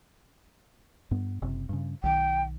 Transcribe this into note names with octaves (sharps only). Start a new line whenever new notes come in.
G2 B3
F#1 C3
G2 C#3
B1 D#3 G5